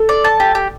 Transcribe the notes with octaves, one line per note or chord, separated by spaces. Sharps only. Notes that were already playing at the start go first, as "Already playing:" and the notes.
Already playing: A4
D5
A5
G4
G4